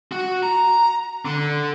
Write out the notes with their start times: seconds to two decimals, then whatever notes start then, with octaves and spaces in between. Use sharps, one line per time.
0.12 F#4
0.43 A#5
1.25 D3